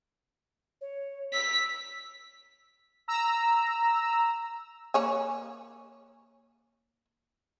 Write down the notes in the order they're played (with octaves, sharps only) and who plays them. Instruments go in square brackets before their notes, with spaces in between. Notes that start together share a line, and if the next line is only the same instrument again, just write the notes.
[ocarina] C#5
[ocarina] E6 [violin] B6
[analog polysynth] A#5 E6
[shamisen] A#3 C#5 G#5